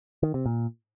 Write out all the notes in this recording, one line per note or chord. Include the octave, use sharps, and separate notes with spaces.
D#3
C3
A#2